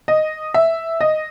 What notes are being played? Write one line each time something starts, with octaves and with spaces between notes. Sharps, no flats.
D#5
E5
D#5